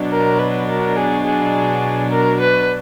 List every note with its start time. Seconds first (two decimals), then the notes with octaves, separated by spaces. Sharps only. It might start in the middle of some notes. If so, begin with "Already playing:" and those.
Already playing: B2 F#3 D4
0.11 A#4
0.39 B4
0.69 A#4
0.96 G#4
1.25 G#4
2.10 A#4
2.40 B4